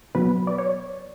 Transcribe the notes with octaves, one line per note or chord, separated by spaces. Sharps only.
B2 F#3 B3 B4
D5
C#5